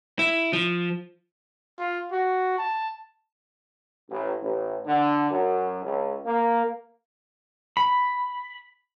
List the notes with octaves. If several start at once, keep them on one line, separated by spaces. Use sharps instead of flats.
E4
F3
F4
F#4
A5
A1
A1
D3
F#2
C#2
A#3
B5